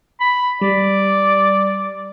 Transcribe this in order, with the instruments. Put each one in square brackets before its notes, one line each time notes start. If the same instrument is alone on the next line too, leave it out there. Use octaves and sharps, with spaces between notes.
[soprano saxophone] B5
[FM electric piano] G3 [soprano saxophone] D5